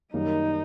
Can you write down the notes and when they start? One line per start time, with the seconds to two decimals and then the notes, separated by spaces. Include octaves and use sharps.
0.14 F#2 D#3 G3 A#3 D#4